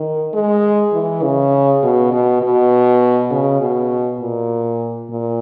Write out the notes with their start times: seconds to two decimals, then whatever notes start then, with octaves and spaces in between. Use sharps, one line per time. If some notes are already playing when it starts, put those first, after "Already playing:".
Already playing: D#3
0.34 G#3
0.94 E3
1.23 C#3
1.83 B2
2.12 B2
2.42 B2
3.31 C#3
3.62 B2
4.21 A#2
5.10 A#2